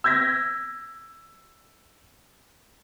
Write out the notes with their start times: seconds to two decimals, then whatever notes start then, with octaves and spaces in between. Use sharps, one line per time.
0.04 E6 G6 G#6 A#6 B6